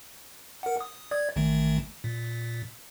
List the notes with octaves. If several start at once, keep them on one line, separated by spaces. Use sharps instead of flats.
A#4 F#5
D#6
D5 G#6
A1 D#3 A3
A#2